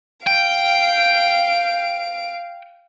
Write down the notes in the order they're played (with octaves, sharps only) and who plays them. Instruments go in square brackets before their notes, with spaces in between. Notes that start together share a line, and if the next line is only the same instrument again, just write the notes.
[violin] F5 D7 [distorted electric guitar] G5